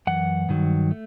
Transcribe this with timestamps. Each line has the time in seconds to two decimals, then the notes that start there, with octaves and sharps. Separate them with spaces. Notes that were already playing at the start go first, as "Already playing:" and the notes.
0.07 F#2 E3 F#5
0.49 G2 D#3 F#3
0.91 A3